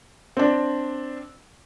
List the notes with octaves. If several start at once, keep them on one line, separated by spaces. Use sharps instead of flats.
C4 D4